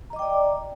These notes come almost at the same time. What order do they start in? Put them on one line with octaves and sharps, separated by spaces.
A#5 D#5 D6 G5 D5